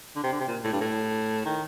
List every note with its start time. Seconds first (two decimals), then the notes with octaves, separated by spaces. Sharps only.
0.16 D3
0.23 C3
0.32 D3
0.40 C3
0.48 A#2
0.64 A2
0.73 G2
0.81 A2
1.46 D#3